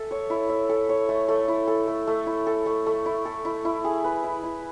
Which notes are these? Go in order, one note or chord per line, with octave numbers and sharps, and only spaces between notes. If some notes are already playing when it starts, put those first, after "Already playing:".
Already playing: A4 E5
C#5
E4
E5
A4
C#5
A3
A3
E4
A4
A3
A3
E4
A4
A3
A3
E4
A4
E4
E4
G#4
B4
E4
E4